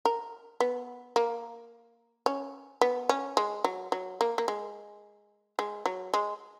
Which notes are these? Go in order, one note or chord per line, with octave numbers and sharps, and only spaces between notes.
A#4
B3
A#3
C#4
B3
C#4
G#3
F#3
F#3
A#3
A#3
G#3
G#3
F#3
G#3